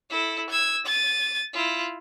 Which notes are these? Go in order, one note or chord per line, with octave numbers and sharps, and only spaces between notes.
E4 A4
E6 G#6
A6 D#7
E4 F4